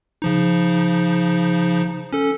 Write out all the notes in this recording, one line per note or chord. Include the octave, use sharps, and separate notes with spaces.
C#3 F3 D#4
C#4 A4